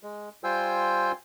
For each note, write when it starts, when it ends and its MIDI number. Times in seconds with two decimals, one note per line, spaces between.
0.03 0.29 56
0.44 1.12 55
0.44 1.12 65
0.44 1.12 72
0.44 1.12 79
0.44 1.12 80
0.44 1.12 88